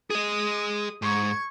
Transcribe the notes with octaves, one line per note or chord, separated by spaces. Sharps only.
G#4 D#5 D#6
G#2 C#6 G#6